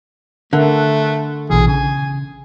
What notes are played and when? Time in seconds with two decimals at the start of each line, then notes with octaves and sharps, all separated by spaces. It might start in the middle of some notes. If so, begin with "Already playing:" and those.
0.53 D3 A3 A#4 E5 F#6
1.50 A#1 B2 E3 G#4
1.68 C#3 G#5